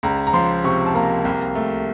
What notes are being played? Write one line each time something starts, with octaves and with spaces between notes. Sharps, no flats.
C#2 A#5
A#5
F3 C6
C3 C#6
A5
A#3 A#5
C2
A3